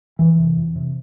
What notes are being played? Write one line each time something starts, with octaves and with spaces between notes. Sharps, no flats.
F2 E3
C3
F2
C3